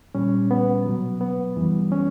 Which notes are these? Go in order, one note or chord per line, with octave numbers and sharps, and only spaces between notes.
A#2 G3 C#4
B3
B2 F#3
B3
F#2 E3 G3
C#4